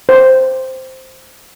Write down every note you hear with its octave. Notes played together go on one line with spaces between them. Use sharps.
C5